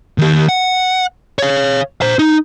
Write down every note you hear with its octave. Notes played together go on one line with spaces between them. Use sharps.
D#3 G4
F#5
C#5 F5
C5 A#5
D#4